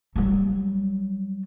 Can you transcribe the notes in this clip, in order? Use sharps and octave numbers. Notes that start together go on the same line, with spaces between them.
F#3 G3